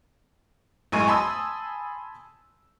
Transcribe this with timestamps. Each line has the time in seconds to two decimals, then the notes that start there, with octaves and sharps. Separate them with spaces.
0.92 A1 F#2 G#3 G#5 C#6 D#7
1.08 G#5 A5 B5 C6 D#6 E6